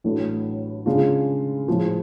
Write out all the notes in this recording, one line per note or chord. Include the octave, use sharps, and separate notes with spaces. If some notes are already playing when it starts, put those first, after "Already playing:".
A1 A2 F#3 A3 D4
C#3 G#3 D4 F4
A2 F3 G#3